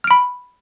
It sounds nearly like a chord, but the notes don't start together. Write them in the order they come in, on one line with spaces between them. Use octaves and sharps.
F6 D7 B5